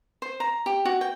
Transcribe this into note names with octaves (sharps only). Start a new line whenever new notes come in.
C5
A#5
G4
F#4
G5